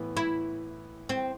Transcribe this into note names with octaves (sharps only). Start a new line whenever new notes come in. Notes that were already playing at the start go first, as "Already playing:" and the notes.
Already playing: A2 E3 B3
E4
C4